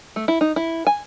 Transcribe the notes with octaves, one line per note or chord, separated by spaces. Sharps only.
A3
E4
D#4
E4
G#5